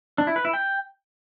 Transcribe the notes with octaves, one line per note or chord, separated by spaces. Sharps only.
D4
E4
B4
E4
G5